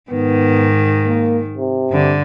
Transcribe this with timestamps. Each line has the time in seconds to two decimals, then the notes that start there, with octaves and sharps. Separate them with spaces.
0.11 G#2 D#3 B3
1.07 A#3
1.58 C3
1.90 G2 D3